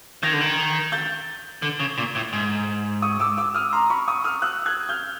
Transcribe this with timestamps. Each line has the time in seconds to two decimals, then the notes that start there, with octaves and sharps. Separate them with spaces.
0.23 D#3 G#6 A#6
0.33 D3
0.41 D#3
0.92 G6 A6
1.62 D3
1.80 C#3
1.98 A#2
2.15 A2
2.33 G#2
3.02 C#6 D#6
3.20 D6 E6
3.37 D6 E6
3.54 D#6 F6
3.73 A#5 C6
3.90 B5 C#6
4.08 C#6 D#6
4.24 D#6 F6
4.42 E6 F#6
4.66 F#6 G#6
4.89 F6 G6